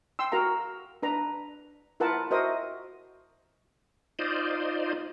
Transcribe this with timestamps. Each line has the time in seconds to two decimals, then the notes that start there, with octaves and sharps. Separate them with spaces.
0.19 G5 C6 E6
0.32 F#4 A#4 F5 A#5
1.03 D4 B4 A#5
2.00 E4 F4 A#4 B4 F#5 A5
2.31 F#4 A#4 C5 D#5 E5 D#6
4.19 D#4 F4 C5 D5 D#5